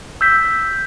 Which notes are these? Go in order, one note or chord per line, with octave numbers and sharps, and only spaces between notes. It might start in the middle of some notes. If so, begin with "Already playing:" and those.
E6 G6 B6